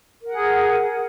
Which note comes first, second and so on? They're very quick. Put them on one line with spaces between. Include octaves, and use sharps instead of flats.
A#4 F#5 G#4